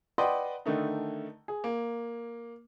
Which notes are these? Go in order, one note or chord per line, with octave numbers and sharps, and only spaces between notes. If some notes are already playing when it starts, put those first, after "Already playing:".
B4 D5 D#5 F#5 G5 C6
D3 D#3 A3 D#4
G#4
A#3